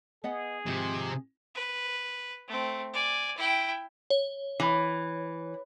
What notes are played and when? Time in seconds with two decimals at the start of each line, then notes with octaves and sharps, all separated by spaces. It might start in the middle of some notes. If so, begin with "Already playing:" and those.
0.24 B3 G#4 D#5 F#5
0.66 G#2 C3 D#3 F3
1.55 B4
2.48 A3 C4
2.93 D5 G#5
3.37 E4 G5
4.10 C#5
4.60 E3